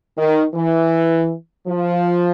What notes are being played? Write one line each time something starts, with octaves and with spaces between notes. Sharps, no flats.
D#3
E3
F3